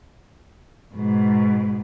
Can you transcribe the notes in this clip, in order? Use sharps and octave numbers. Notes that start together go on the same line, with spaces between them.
G#2 B2